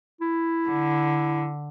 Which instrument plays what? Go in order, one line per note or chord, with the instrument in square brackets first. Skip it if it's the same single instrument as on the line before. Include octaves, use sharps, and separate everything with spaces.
[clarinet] E4
[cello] D3